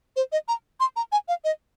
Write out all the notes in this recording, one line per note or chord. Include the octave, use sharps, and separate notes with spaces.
C5
D#5
A#5
C6
A#5
G#5
F5
D#5